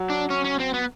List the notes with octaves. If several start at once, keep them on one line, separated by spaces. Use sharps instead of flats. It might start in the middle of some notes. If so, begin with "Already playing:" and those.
Already playing: F#3
D4
C#4
C#4
C4
B3